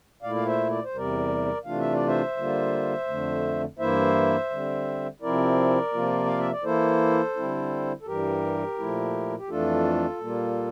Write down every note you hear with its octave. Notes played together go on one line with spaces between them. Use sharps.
A#2 A3 E4 D5 F5
F5
C5 E5
D5
C5
E2 C3 G3 A#4 D5
C3 E3 A3 D4 F4 F5
E5
D5
C5 E5
D3 G3 A#3 F4
F2 D3 A3
G2 E3 A#3 E4 C5 E5
D3 G3 C4
C3 F3 C4 E4 A#4 D5
C3 F3 A#3 F4
F5
E5
D5
E3 A#3 E4 A4 C5
D3 G3 C4 E4
A4
G2 E3 G3 G4 A#4
A#2 F3 A3 E4
G4
F2 E3 A3 D4 F4 A4
A#2 G3 A#3 F4